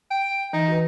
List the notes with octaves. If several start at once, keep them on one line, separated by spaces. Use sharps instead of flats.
G5
E3 D#4
F#4 B4